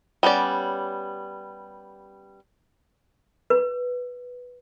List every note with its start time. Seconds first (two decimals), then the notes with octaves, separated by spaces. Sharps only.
0.23 G3 B3 C#4 D5
3.50 B4